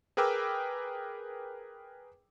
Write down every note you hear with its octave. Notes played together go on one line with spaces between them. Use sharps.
G#4 A#4 B4 G5 D6 E6